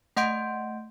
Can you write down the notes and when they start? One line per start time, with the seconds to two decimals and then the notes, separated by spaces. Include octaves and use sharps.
0.17 A3 D#5 F#5 C6 G6 D7